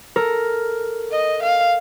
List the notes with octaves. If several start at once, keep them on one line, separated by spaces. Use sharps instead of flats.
A4 A#4
D#5
F5